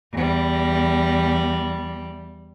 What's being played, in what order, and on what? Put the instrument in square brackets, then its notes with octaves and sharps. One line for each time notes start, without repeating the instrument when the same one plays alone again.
[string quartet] E2 G3